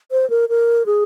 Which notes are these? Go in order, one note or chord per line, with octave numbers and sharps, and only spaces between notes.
C5
A#4
A#4
G#4